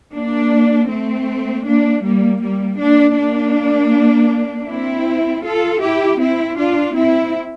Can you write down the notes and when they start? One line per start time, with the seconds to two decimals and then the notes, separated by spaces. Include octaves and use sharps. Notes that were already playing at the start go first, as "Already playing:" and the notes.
0.14 A#3 D4
0.89 A3 C4
1.65 A#3 D4
2.03 G3 A#3
2.41 G3 A#3
2.79 A#3 D4
3.16 A#3 D4
4.68 C4 E4
5.44 F4 A4
5.82 E4 G4
6.20 C4 E4
6.58 D4 F4
6.95 C4 E4